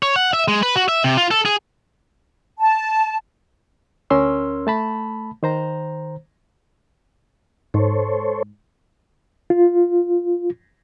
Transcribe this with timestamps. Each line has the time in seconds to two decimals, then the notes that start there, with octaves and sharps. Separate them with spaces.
0.03 C#5
0.16 F#5
0.33 E5
0.48 G#3
0.63 B4
0.76 F#4
0.89 E5
1.04 C3
1.17 F4
1.31 A4
1.46 G#4
2.59 A5
4.10 D2 C#4 A#4 C6 E6
4.67 A3 A5 B5
5.43 D#3 C5 A#5
7.74 G#2 A4 C5 C#5
9.50 F4